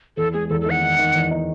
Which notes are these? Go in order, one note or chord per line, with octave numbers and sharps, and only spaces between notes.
E2 A4
G#3 G#4
E2 A4
A4
D#3
F#5
D#3
D#3
E2
D#4